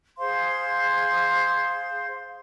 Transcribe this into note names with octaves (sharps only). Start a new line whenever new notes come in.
G#4 C5 F5 C6